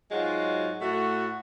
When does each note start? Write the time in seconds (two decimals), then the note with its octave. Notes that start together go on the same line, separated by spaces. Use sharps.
0.11 G#2 F#3 G#3 F4 F#4
0.81 A2 A3 F#4